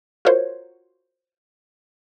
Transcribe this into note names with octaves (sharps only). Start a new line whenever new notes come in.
F4 F#4 A#4 C5 C#5